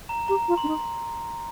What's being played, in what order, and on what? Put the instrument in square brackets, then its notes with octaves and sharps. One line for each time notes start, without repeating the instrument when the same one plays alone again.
[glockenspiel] A#5
[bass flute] G4 [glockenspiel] A#5
[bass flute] F4
[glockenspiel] C6
[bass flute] D4
D#4